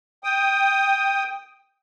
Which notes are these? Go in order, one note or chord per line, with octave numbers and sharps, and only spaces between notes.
G5 D#6